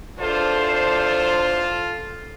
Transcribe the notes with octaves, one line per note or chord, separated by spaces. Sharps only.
E2 D4 F4 A4 C5